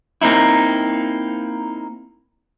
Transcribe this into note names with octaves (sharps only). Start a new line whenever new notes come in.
A#3 C4 D#4 E4